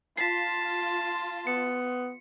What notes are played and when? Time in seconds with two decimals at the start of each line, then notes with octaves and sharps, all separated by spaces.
0.17 F4 A5 B6 C7
1.47 B3 C#7